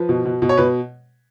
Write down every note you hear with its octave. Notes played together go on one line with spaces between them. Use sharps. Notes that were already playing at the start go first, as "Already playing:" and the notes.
Already playing: F3 B4
B2
B2
B2
C#5
B2 B4